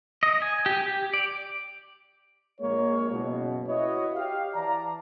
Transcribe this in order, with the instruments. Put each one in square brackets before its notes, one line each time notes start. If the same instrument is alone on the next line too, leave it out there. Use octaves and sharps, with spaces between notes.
[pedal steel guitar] D#5
G#5
G4
G4
D5
[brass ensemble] A#1 G#3 A#3 C#5
F#1 B2
E4 F#4 B4 C#5 D#5
G4 F5
E3 D5 A5 A#5